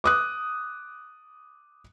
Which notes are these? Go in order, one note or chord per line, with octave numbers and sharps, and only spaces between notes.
D6 D#6 F#6